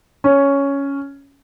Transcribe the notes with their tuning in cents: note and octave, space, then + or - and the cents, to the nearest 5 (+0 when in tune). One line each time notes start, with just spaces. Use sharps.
C#4 +5